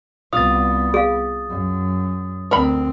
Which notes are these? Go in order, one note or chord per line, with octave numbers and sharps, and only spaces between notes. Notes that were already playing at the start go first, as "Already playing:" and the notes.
C2 B3 F4 D#6 A6
G#4 F5
F#2
D2 C4 A#4 B5